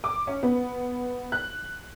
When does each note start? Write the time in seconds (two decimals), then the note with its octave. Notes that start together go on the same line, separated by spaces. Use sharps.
0.04 D6
0.27 C#4
0.43 B3
1.32 F#6